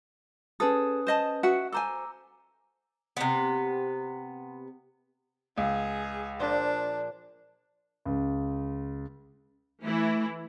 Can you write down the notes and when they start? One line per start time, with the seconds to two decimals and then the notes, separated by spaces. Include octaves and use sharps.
0.60 C#4 G#4 A4 B4 D#6
1.07 C5 D#5 A5
1.43 F#4 E5 F#5
1.72 A4 C5 G#5 A#5 D6 E6
3.17 C3 B3
5.58 C#2 G#4
6.40 A#2 F3 D4 C5
8.05 C#2
9.83 E3 A3 E4